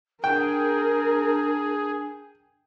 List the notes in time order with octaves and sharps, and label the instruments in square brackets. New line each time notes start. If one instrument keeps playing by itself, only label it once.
[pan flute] D4 [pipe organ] G#4 [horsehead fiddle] A#4 [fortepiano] G5